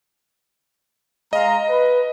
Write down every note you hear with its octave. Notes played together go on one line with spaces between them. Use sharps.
G#3 D#5 F5 A#5
B4